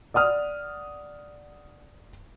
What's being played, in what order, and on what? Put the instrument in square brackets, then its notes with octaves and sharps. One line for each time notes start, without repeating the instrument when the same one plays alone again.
[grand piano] D5 F#5 D#6 F6